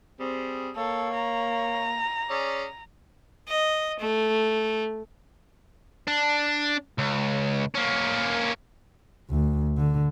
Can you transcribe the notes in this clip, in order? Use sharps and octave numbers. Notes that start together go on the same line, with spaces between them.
G3 C4 G#4
A#3 A4 C#5
A#5
C#4 G#4 D5
D#5
A3
D4
C#2
A#3 C#4
D2
D3